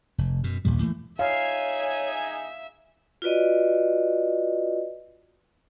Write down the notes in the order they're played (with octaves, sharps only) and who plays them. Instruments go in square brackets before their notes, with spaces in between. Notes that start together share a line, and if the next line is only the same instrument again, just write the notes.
[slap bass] F1
F#2 B2
A#1 D#2 A#2 G3
E3 A3 A#3
[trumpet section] D#4 G#4 G#5 [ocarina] C#5 [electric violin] E5 [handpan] F5
[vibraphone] F4 F#4 B4 D5 D#5